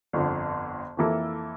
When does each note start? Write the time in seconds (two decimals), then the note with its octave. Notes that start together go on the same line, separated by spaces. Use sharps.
0.13 G1 F2 D3
0.97 F2 E3 A#3 E4 A4